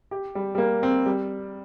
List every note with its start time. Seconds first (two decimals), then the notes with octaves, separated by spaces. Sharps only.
0.11 G4
0.35 G3
0.55 G3
0.58 A#3
0.83 C4
1.06 G3